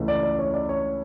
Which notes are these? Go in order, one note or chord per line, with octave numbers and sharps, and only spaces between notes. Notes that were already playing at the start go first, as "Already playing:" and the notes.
Already playing: C#2 C#3 E3 A3
D5
D5
C#5
D5
C#5